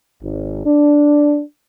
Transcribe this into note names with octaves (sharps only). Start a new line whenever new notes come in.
G#1
D4